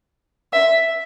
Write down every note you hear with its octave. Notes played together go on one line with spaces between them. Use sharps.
E5